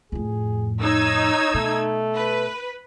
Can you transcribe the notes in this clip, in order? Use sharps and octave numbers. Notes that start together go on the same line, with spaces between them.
F2 A2 G#4
D#4 C#5 E6 G#6
B2 A3
B4